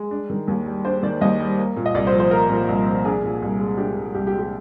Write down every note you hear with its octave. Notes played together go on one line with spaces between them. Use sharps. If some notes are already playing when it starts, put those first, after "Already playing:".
Already playing: G#3
D4
D#3
D#2
G3
D4 C5
D#3 D5
D#2 D#5
G3
A#3
A#2
D#5
C2 D5
C5
F3
C5
A#3 A#4
A#2
C2
F3
D4 G#4
A#2
C2
G#3
D4 G4
A#2
C2 G4
G4
G#3
G4